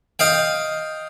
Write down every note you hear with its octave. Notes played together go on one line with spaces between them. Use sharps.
D#5 F5 G5